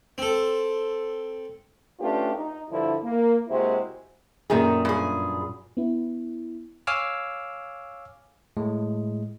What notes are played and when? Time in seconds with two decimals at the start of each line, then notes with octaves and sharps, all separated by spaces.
0.18 C4 A4
2.00 A3 C#4 D4 F4 G4 B4
2.34 D#4
2.69 G2 D3 F3 E4
3.03 A#3
3.48 C3 G#3 A#3 E4 F#4 C5
4.50 F#2 A#2 D#3 G#4
4.85 G2 G#4
5.77 B3 E4
6.87 C#5 F5 G#5 D6 E6 F6
8.57 A2 G#3